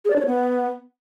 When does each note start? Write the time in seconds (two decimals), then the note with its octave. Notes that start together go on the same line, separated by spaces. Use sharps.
0.05 G#4
0.10 D5
0.16 D4
0.21 C#5
0.26 B3